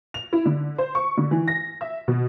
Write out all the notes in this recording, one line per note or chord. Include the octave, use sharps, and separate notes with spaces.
F7
E4
D3
C5
C#6
D3
E3
A#6
E5
B2